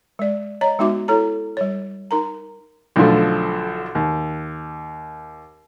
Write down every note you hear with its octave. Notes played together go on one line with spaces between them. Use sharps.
G#3 D5
C#5 D#5 A#5
G#3 B3 D#4 F#4 E5 D6
E4 A4 C#5 A#5
G3 C#5
D#4 A#4 A#5
B1 D3 F3 A3
D#2